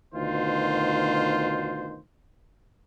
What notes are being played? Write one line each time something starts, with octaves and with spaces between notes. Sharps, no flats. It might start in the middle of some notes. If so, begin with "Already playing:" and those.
D2 B2 D#3 F4 C5